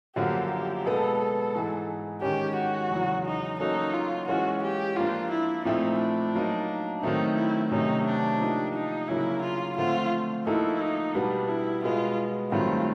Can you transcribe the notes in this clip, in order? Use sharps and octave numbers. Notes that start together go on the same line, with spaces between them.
F#2 D3 F3 A#3 G4
G4
B2 G#3 B3 A4
A4
G#2 E3 G#3
D#3 G#3 C#4 G4
F#4
E2 C#3 F#3
D#4
F#3 A#3 C#4 D#4 F#4 A4
F4
E3 G#3 C#4 F4 F#4
G4
F3 A#3 D4 F4
E4
A#2 F3 A3 C4 D#4 E4
D4
F#3 A#3 D#4
D#3 F#3 A3 C4 D#4
E4
C3 D#3 F#3 A3 C#4 D#4
D4
F3 A#3 D#4 G4
D#4
C#3 F#3 A#3 D4 E4
F4
D3 F3 A3 C4 F4
F3 A#3 D#4 E4 F#4 A4
D#4
B2 G3 B3 D4
E4
B2 G#3 B3 F4
G2 D#3 F#3 A3 C4 F4